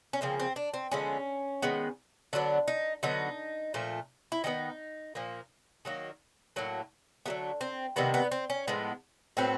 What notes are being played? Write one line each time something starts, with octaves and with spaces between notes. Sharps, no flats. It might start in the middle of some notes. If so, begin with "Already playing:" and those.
C#4
C#3 F3 A#3 C4
C4
D4
C4
D3 F3 G#3 B3 C#4
D#3 G#3 B3
D3 F#3 B3 D4
D#4
D3 F#3 B3 D#4
A#2 F3 A3
E4
D#3 F#3 B3 D#4
A#2 F3 A#3
D#3 F#3 A#3
A2 F#3 A#3
D3 F#3 A3 B3
C4
C3 D#3 G3 A#3 B3
B3
C4
C#4
A2 F3 G#3 B3
A2 F#3 B3 C4